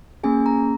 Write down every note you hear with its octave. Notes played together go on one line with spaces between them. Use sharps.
A#3 C#4 G#4 G#5
A#5